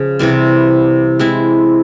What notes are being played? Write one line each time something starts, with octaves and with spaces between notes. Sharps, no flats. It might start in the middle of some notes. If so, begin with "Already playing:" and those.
Already playing: C#3 F3
C3 E3 G3 C4
G#3 C4 E4